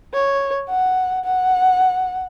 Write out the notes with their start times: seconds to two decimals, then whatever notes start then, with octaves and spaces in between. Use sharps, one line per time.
0.14 C#5
0.69 F#5
1.25 F#5